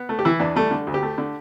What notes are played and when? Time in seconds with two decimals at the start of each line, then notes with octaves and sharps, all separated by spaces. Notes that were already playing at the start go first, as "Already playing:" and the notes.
Already playing: B3
0.09 A3
0.19 G4
0.25 E3 E4
0.40 E2 D4
0.56 G3 A3
0.71 D3
0.87 D2
0.94 G4
1.03 A3
1.18 D3